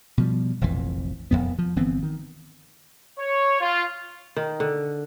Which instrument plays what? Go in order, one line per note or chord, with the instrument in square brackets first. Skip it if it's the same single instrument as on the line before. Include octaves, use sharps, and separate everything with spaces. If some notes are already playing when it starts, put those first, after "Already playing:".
[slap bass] B2 F3 G3
F1 A#1 F2 E3
D#1 G#1 F2 B3
F3
G1 E3 B3 C4
D#3
[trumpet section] C#5
F4
[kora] D#3
D3